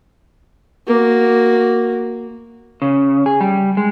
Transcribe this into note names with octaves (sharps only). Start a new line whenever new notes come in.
A#3 F#4
C#3
G#4
G3
G#3